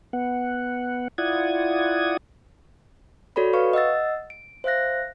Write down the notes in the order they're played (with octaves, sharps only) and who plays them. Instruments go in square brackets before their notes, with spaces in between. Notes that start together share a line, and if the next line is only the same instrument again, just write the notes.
[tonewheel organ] B3 F#5
E4 F4 D5 F#5 D#6 G#6
[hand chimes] F#4 A4 C#5 D5 B5
B4 F5 C#6
D#5 F#5 E6 A6
D7
C5 E5 F5 F#6 A#6